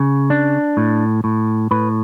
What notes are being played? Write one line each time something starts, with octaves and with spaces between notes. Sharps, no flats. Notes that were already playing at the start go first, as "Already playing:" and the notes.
Already playing: C#3
D4
A2
A2
A2 B4